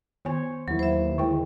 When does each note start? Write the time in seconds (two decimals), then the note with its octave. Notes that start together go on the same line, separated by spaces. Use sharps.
0.25 D#3 B3 C5 C#5 G#5
0.68 D#2 E3 F#3 A#3 E4
0.79 D#2 C5 E5
1.18 D3 D#3 G#3 E4 G5